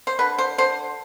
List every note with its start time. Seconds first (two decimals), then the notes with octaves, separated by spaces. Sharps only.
0.07 C5
0.19 D3 B4
0.38 C5
0.58 D3 C5